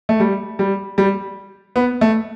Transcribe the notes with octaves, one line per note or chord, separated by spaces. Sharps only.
A3
G3
G3
G3
B3
A3